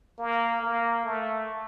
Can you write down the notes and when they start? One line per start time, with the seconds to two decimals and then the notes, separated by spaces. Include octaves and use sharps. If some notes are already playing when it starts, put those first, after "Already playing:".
0.18 A#3
0.62 A#3
1.05 A3